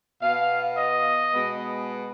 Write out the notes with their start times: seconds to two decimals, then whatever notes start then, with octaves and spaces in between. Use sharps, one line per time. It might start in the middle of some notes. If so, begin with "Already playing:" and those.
0.22 B2 B3 F5
0.77 D#5
1.33 B2 G#3 B3